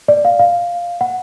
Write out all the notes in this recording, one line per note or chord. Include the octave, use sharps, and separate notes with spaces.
D5
F5
F5
F#5